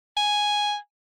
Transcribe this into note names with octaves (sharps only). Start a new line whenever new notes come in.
G#5